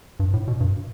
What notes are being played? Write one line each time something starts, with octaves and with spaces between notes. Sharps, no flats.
G2
A2
B2
G2